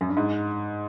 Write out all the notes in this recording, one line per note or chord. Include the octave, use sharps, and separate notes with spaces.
F#2
G2
G#2